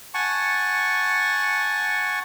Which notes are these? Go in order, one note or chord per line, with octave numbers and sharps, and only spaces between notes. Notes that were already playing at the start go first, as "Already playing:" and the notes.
F#5 G#5 A5 C#6